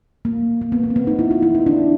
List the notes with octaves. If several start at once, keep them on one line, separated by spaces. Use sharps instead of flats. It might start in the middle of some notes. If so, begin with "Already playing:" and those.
A#3
A#3
B3
B3
C4
B3
D#4
E4
F4
E4
D#4
D4